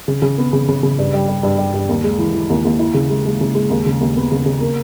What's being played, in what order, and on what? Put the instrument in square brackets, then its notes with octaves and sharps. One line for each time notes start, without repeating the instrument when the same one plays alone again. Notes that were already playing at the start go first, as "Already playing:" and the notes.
[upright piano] C#3
C#3
B3
C#3
C#3
C#3
G2
G3
G3
G2
G3
G2
D#2
G#3
E3
E3
D#2
D#2
E4
C#3
G#3
G#3
C#3
G#3
D#2
C#3
D#2
B3
C#3
C#3
A#3